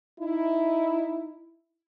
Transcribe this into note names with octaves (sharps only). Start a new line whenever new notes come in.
D#4 E4